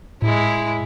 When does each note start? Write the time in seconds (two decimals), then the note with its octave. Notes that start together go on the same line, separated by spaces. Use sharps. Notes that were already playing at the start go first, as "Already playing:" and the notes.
0.22 A2 G#3 E4